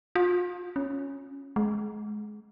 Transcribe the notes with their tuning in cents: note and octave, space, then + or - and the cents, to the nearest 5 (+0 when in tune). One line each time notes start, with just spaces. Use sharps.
F4 +35
C#4 +0
G#3 +25